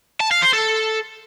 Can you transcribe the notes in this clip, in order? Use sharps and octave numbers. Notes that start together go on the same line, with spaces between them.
A5
F5
C5
A4